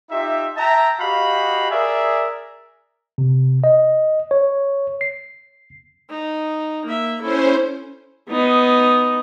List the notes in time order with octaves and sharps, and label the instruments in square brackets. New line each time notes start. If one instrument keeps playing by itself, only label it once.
[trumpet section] D#4 F4 G4 E5
E5 G5 A5 A#5
F#4 G4 D#5 F5 B5
G#4 A#4 D5 E5
[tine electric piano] C3
D#5
C#5
C7
[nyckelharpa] D#4
A#3 E5
[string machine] C#4 C5 [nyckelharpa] E4 A4
[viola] B3 D#4